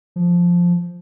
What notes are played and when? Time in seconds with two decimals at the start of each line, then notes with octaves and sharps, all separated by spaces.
0.16 F3